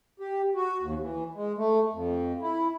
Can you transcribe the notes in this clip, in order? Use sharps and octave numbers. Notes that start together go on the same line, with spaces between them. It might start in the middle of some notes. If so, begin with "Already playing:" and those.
G4
F#4
D#2
E3
G#3
A3
F2
E4